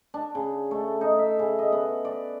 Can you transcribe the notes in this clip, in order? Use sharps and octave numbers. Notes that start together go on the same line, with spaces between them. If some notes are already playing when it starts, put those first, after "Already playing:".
D4
C#3
A3
D#4
E5
C#3
D#5
B3
D5